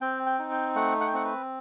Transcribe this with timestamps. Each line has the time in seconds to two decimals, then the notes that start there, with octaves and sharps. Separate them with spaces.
0.01 C4 G5
0.27 G5
0.39 D#4
0.51 G5
0.75 A3 F#5
1.00 F#5
1.07 G5
1.13 C4 F#5
1.25 B4